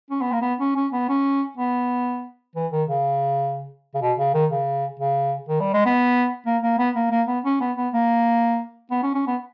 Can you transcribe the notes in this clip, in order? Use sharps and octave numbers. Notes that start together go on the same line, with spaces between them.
C#4
B3
A#3
B3
C#4
C#4
B3
C#4
B3
E3
D#3
C#3
C#3
B2
C#3
D#3
C#3
C#3
D#3
G3
G#3
B3
A#3
A#3
B3
A#3
A#3
B3
C#4
B3
B3
A#3
B3
C#4
C#4
B3